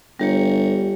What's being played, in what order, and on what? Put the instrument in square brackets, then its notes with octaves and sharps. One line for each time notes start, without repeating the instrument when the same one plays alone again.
[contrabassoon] G1 [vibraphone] G3 G4 C#5